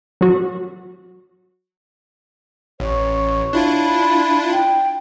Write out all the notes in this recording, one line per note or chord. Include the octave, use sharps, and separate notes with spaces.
F#3 F#4
A1 C#5
D4 E4 F4
B5
G5